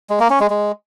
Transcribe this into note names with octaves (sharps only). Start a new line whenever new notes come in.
G#3
A#3
C#4
G#3
G#3